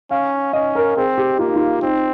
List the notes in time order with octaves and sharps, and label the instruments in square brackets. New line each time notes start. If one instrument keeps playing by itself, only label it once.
[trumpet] C#4 [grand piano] F5
[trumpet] C#4 [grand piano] D#5
[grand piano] A#4
[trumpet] C4 [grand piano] G#4
[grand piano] G4
[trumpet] A#3 [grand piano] F4
[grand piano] D#4
F4
[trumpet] C4 [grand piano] D#4